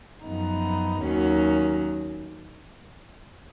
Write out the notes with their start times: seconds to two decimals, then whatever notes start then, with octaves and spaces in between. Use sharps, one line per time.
0.23 F#2 F3 B3 D#4
1.00 D#2 D#3 F#3 C#4